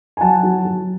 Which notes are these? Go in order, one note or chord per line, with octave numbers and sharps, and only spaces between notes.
G#5
F#3 F#5 A5
F#3
F#3